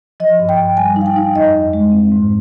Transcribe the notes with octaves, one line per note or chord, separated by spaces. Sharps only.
F3 D#5
G2
G5
G2
G3 G#5
D#4
F5
G5
D#4
F2 D#5
F2
G#3
C4
G#2